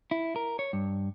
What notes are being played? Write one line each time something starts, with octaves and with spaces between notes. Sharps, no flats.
E4
A#4
C#5
G2